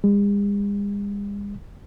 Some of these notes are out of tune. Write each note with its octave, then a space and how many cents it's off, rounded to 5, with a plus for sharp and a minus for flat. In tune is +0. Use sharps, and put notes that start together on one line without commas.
G#3 -45